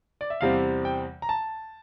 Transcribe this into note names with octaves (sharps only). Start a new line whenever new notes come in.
D5
E5
E2 C3 G3 C4 F5
G5
A#5
A5